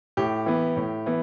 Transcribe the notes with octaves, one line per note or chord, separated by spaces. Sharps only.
A2 G4
E3 B3
A2
E3 B3